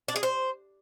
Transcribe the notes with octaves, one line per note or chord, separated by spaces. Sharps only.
D4
G#4
C5